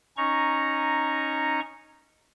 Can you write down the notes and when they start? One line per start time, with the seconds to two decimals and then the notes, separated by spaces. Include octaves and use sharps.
0.17 C#4 D#4 A#5 C#6